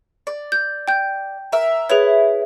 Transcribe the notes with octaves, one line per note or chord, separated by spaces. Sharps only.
D5
G6
G5 G6
A#4 E5
E4 G#4 B4 C#5